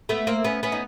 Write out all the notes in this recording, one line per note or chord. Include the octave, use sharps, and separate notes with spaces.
A3 B3
A#3 C4
B3 C#4
B3 C#4
D#4